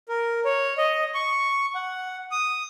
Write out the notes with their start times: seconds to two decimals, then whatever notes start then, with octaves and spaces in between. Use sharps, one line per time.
0.09 A#4
0.45 C#5
0.78 D#5
1.15 C#6
1.75 F#5
2.31 D#6